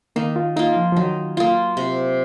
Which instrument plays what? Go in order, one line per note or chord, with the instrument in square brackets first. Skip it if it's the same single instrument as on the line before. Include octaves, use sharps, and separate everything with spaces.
[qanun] D#3 [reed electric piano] A#3
[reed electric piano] F4
[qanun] A#3 F4 [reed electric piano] D#4
[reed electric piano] F3
F3
[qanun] D#3 [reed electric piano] F#3
[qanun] A#3 F4
C3